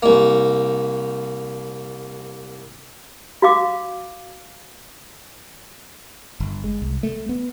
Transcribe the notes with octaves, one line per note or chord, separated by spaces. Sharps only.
C2 A#3
F#4 F5 D6
G1
G#3
C2
A3
B3